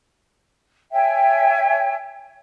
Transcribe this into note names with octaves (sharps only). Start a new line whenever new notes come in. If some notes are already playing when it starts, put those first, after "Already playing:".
C#5 E5 G5 G#5